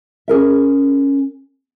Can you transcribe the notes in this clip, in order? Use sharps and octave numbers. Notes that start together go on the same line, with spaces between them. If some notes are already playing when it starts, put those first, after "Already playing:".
C#4 G#4 A#4 E5